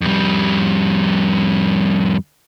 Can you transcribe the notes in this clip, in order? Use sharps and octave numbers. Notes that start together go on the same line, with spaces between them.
F2 G3